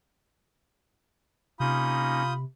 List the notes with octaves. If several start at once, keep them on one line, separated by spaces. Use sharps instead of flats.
C3 A#3 C#4 D#4 F4 B5 D#6 G6